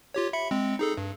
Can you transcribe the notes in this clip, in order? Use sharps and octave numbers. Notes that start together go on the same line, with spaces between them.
F4 G4 C#5
E5 B5 C#7
G#3 C4
D#4 G#4 A4
G2